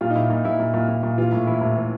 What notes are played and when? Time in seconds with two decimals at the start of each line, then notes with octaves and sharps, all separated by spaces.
0.01 A#2 F4
0.10 D#4
0.16 A#2 E4
0.30 A#2 D#4
0.45 A#2 E4
0.60 A#2
0.74 A#2
0.88 A#2
1.03 A#2
1.17 E3 F4
1.33 A2
1.47 E3 E4
1.61 A2
1.76 E3